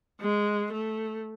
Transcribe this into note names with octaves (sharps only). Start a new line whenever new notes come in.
G#3
A3